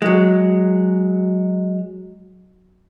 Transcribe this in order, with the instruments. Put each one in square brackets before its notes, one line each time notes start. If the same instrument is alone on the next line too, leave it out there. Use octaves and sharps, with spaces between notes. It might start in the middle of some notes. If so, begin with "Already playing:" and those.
[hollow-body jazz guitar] F#3 G#3